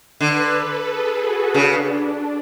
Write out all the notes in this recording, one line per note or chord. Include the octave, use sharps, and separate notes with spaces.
D3 B4
A4
G#4
F#4
C#3 D4